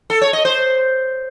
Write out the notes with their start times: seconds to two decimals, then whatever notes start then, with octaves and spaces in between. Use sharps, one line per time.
0.10 A4
0.22 C#5
0.33 D#5
0.45 C5